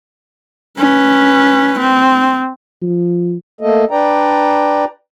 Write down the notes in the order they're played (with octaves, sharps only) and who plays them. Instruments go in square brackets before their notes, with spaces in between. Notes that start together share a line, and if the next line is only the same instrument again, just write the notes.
[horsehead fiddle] C#4 B4
C4
[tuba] F3
[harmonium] A3 A#3 A4 D#5
D4 B4 D5 G5 A#5